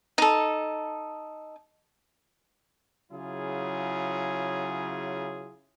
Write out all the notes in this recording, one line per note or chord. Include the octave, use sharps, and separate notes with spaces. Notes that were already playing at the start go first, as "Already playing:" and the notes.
D#4 A4
C#3 F#3 E4 F4 G#4